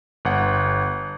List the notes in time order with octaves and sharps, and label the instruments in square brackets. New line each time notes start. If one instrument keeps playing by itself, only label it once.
[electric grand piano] G1 F#5